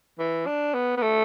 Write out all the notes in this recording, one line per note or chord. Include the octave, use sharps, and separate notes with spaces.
E3
D4
B3
B3
A3